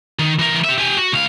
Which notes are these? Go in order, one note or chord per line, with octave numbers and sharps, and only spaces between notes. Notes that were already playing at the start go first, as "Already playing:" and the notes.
D#3
E3 A#4
G4 E5
G4 G#5
F#4
C#2 F5